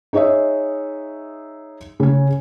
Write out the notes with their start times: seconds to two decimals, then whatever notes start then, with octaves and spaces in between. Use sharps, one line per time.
0.13 D#4 G#4 C#5 D#5 E5
2.00 C#3 C#4